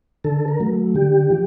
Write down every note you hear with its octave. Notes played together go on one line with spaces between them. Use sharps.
D3 A4
A#4
F#3 A3
D3 G4
F3